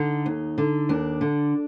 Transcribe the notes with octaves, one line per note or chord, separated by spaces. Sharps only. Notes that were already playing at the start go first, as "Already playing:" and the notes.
Already playing: D3 D#4
D#2
D3
D#2 D4
D3